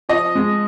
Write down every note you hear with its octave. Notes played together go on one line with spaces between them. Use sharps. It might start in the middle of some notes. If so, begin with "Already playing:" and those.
F3 D#5
G#3